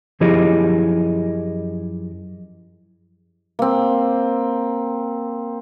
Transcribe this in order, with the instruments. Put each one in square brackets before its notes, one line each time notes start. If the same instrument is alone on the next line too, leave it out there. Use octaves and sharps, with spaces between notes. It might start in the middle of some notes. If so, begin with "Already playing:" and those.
[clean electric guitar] F#2 F3 E4 G4 G#4 D#5
[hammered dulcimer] A#3 C4